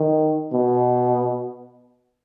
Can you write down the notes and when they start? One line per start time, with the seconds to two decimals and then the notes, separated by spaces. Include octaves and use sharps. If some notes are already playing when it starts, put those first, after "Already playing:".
Already playing: D#3
0.53 B2